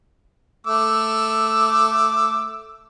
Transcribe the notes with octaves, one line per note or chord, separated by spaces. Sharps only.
A3 D6 E6